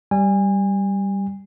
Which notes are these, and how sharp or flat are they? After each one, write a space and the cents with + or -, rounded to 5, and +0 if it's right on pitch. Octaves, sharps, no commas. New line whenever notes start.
G3 +0 G#5 -30